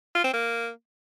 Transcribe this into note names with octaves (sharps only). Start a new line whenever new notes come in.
F4
C4
A#3